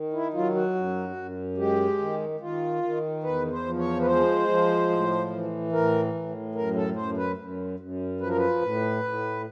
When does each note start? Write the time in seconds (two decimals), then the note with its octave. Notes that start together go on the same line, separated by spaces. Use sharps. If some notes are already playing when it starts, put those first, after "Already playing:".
Already playing: D#3
0.13 E4
0.34 F#3 F4
0.55 F#4
0.75 F#2
1.16 F#2
1.57 G#3 G4
1.99 D#3
2.40 D#3 F4
2.83 D#3
3.23 E2 B4
3.51 C5
3.65 F3
3.79 C#5
4.01 B4
4.06 G#3 C5
4.48 F3
4.90 A2
5.31 E3
5.72 A2 A#4
6.14 A2
6.55 F#2 A#4
6.75 A4
6.96 F#2 C5
7.17 B4
7.37 F#2
7.80 F#2
8.20 F3 B4
8.29 A#4
8.37 B4
8.62 A2
9.04 A2